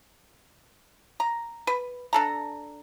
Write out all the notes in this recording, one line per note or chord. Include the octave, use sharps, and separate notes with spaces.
A#5
B4
D4 A4 A#5